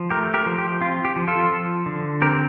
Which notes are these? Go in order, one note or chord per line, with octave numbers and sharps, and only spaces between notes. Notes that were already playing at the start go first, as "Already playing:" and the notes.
Already playing: F3
A3 G4 A#4
G4 A#4
F3
G4
C4 F4
G4
F3
F4 A4
F3
D3
C4 G4 A#4